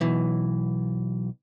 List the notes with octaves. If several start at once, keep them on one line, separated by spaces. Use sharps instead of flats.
B1 E3